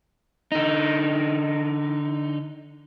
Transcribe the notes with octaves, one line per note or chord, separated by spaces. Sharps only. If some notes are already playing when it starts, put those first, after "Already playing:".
D3 D#4